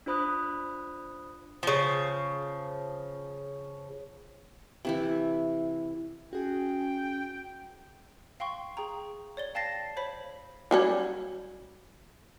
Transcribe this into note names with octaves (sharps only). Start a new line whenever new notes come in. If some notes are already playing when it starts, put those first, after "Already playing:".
D4 F4 C5 B5 D#6 F#6
C#3 F3
C3 E3 E4
C#4 F#4 G#4 G5
F5 G5 C6 C#6
G#4 G5 A#5
C#5 D5 G7
F5 G5 A5 A6 A#6 C7
C5 C#5 B5 B6
F#3 G3 C#4